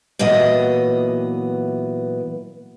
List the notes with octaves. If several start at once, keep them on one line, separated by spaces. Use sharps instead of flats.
A#2 E3 F#3 B3 D#5